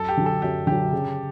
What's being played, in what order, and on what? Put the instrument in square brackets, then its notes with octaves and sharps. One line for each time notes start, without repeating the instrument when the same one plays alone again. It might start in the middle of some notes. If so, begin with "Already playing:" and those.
Already playing: [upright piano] F#2 [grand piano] A4
[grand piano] G4
[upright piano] D3 F#3
[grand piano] A4
[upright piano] F#2 [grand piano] G4
[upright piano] D3 F#3 [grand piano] G4
[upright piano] C#3